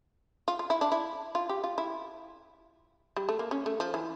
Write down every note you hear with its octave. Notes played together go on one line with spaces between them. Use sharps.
F4
F4
E4
D4
E4
F4
G4
F4
E4
G3
A3
A#3
C#4
A3
F3
E3